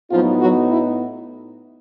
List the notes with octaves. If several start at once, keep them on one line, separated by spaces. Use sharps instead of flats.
A2 F3 F#3 B3 D#4 F4
F#3 F#4
E4